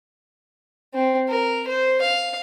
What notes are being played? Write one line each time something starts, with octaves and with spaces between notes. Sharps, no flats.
C4
A#4
C5
F5